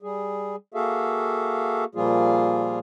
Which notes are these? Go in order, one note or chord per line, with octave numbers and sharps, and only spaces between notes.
G3 G#4
A#3 F#4 G#4 A4 E5 F5
A#2 F3 G3 A#3 F4 G#4